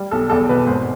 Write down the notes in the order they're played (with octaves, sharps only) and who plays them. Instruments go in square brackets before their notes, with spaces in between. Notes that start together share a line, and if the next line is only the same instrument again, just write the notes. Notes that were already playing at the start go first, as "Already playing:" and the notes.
Already playing: [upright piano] G3
B1 A4
E2 A4
B2 B4
G#1 C5